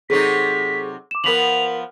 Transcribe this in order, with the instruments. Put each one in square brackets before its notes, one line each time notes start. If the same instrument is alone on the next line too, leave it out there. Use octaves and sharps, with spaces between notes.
[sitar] C3 F#3 D#4 [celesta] G#4 A4 C#6 [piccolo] B6
[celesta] D6 E7
[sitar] F3 B3 [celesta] A#4 B6 F#7 [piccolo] F7